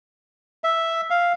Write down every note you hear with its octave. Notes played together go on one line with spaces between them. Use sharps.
E5
F5